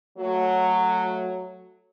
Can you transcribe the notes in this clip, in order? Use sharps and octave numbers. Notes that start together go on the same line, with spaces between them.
F#3 A3